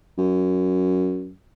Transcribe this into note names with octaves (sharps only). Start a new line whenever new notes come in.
F#2